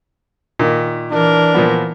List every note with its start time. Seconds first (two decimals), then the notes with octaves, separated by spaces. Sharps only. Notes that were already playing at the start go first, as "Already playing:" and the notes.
0.59 A#2 D#3
1.11 E3 D4 A#4
1.54 A#2 F3 B3